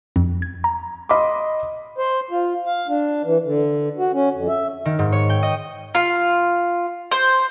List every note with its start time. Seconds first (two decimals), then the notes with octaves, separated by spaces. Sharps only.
0.16 F2
0.42 G#6
0.64 A#5
1.09 D#5 B5 C6 D6
1.98 C5
2.31 F4
2.66 F5
2.88 D4
3.25 E3
3.45 D3
3.98 F#4
4.13 C#4
4.35 F2
4.48 E5
4.85 D#3
4.99 G#2
5.12 C#5
5.29 G5
5.43 D#5
5.95 F4
7.12 C5